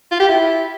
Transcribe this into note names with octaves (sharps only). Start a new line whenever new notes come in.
F4
G4
E4